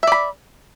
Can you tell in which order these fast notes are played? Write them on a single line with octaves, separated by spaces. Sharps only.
E5 D5 B5